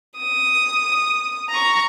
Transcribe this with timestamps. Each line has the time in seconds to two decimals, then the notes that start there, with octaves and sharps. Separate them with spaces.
0.19 D#6
1.49 A#5 C#6